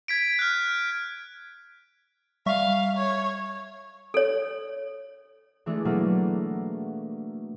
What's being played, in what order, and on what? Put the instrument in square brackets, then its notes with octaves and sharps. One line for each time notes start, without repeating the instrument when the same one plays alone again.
[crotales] G#6 B6 D7
F6 F#6
[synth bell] G3 E5 C#6 [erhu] F5
[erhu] C#5
[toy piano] A4 C#5
[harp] E3 G#3 A3 D4
B2 F#3 A3 A#3